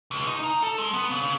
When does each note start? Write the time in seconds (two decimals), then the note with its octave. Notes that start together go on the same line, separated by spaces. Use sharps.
0.11 C#2
0.27 D#4
0.44 A#5
0.63 A4
0.78 G#3
0.93 B3
1.11 C#3